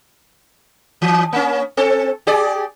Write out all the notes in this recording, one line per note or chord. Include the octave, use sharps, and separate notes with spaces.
E3
A#3 C#4
C4 A4
G4 G#4 D5